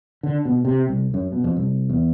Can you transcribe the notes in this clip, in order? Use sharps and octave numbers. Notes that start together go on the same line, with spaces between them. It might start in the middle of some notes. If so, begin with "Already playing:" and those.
D3
B2
C3
C2
F#2
B2
F2
C2
E2